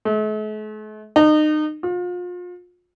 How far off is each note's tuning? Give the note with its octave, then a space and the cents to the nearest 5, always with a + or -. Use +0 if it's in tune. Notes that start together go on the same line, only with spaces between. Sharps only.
A3 -45
D#4 -30
F4 +35